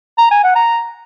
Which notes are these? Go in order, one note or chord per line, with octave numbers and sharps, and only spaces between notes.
A#5
G#5
F#5
A#5